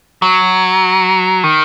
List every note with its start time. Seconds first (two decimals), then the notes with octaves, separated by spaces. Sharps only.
0.22 F#3
1.44 D#3